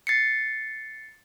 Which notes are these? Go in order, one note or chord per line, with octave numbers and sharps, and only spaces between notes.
A6 C7 C#7